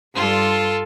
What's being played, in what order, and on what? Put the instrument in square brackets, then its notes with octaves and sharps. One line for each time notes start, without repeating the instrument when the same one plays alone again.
[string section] G2 C6 [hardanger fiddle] F4 A4